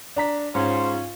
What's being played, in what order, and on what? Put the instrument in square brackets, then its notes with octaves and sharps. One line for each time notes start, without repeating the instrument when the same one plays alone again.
[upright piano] D4 A#5 B6
[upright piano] G#2 [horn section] C#4 [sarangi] F4 [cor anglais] C5